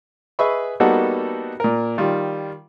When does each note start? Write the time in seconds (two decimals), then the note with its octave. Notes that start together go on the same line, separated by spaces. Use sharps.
0.39 G#4 B4 D#5 E5 B5 C#6
0.80 G3 A#3 B3 D#4 F#4 A4
1.60 A#2 A#4
1.98 D#3 G3 F4